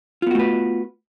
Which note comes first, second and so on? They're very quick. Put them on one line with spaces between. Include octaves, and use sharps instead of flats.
F4 B3 F#4 A3 B4